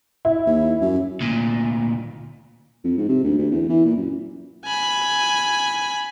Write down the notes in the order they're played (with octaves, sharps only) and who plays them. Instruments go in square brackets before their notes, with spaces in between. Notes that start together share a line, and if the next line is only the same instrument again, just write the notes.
[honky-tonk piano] E4
[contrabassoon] D#2
F#2
[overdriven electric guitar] D2 A#2
[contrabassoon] F2
G#2
C3
D2
D2
E2
E3
A#2
F#2
[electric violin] G#5 B5